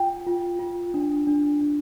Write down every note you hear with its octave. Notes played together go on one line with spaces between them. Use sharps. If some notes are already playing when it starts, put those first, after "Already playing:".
Already playing: F4 G5
F4
F4
D4
D4
D4